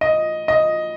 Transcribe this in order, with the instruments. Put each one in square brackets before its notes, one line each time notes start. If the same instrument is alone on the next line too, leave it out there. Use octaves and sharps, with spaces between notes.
[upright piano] D#5
D#5